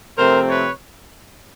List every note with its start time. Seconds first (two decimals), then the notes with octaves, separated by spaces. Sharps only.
0.17 C3 F3 A3 C4 A#4 C5
0.49 B4 C#5